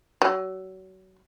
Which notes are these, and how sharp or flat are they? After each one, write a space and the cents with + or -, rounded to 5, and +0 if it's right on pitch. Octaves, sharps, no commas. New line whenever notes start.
F#3 +30